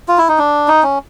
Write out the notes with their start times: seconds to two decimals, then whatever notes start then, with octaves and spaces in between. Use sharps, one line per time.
0.08 F4
0.18 E4
0.29 D#4
0.38 D4
0.68 D#4
0.83 C#4